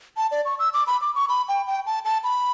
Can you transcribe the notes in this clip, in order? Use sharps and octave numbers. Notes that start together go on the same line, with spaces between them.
A5
D5
C#6
E6
D6
B5
D6
C#6
B5
G5
G5
A5
A5
B5